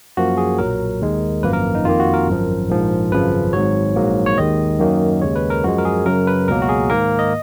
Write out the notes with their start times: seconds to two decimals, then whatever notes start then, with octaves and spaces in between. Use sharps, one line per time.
0.17 F#2 F3 A#3 F#4
0.37 G#4
0.58 B1 A#2 F#3 A#4
1.01 D#2 D#3 G#3
1.43 G#1 F#2 F3 A#3 B4
1.53 A#4
1.75 D#4
1.85 F2 D#3 A#3 F4
2.00 F#4
2.14 A#4
2.27 G#1 F#2 F3
2.69 A#1 G#2 F3
3.11 G#1 F#2 C#3 F3 B4
3.53 G#1 G#2 F#3 C#5
3.96 A#1 G#2 F#3 A#3
4.26 C#5
4.38 D#2 D#3 G#3 D#5
4.79 F#2 D#3 F#3 A#3
5.21 D#2 C#3 G#3 C#5
5.36 B4
5.50 A#4
5.64 F#2 F3 G#3 F#4
5.78 A#4
5.85 G#4
6.06 F#2 C#3 F#3 A#4
6.27 B4
6.48 C#2 B2 F#3 A#3 A#4
6.62 F#4
6.69 G#4
6.90 G#2 D#3 A#3 A#4
7.19 D#5